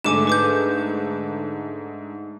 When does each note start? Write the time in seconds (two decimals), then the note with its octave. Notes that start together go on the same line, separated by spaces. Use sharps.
0.04 G#2 D3 A3 G#5 D6 E7
0.27 B4 D6 G6